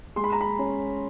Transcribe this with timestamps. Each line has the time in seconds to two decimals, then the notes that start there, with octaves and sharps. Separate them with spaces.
0.16 G#3 C6
0.24 B5
0.33 A#5
0.41 B5
0.59 C#4